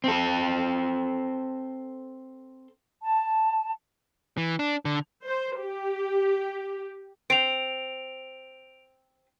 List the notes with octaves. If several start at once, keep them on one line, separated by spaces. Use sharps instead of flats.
C4 A4
A5
E3
D4
D3
C5
G4
C4 D7 F7